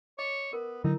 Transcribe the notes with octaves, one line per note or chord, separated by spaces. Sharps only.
C#5 D#5 D6
B3 A#4
D3 F#3 D#4 E4 A#4